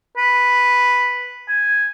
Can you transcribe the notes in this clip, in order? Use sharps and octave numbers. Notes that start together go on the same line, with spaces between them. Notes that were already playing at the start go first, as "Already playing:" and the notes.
B4
G#5